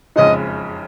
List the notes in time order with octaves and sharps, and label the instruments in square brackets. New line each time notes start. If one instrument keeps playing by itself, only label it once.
[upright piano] F#1 F2 C#3 G#3 D#4 [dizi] D#5